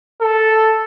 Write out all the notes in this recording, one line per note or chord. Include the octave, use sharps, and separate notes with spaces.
A4